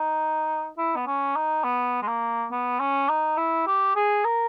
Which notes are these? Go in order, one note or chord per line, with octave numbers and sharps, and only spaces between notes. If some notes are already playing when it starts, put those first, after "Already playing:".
Already playing: D#4
E4
B3
C#4
D#4
B3
G#3
A#3
B3
C#4
D#4
E4
G4
G#4
A#4